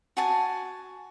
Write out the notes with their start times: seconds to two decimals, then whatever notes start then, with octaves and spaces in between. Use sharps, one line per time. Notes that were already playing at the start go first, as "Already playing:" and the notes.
0.17 F#4 G#5 A5